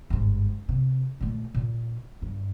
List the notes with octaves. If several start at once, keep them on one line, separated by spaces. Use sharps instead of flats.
G1 G#2
C3
A#2 A3
A#2
G2